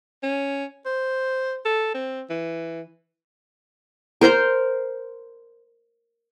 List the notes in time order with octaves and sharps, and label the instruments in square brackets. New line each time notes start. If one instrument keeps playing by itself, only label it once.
[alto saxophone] C#4
C5
A4
C4
E3
[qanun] A#4 C5 A#5 C6